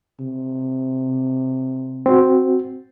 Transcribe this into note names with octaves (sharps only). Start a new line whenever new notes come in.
C3
C4 F#4